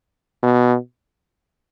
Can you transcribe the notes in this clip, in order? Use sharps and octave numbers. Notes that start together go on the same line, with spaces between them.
B2